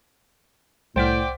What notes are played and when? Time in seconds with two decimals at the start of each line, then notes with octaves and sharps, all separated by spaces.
0.96 C2 A2 C5 D5 F#5 G5 F6 B6